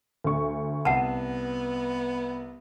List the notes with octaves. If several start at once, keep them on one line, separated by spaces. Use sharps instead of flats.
D2 C#6
C2 B3 F#5 A5 E7